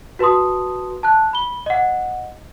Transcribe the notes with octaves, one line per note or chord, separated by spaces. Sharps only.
F#4 B4 A5 C6 D#6
A5 F#6
B5 G7
D#5 F#5